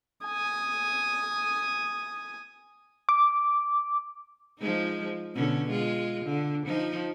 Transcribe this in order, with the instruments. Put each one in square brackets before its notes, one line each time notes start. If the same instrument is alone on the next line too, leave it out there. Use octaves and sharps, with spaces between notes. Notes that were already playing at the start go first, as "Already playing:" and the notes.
[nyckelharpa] G#5 D#6
[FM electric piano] D6
[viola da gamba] F3 G#3 D#4
B2 D3 C#4
G#3 F4
D3
F3 D#4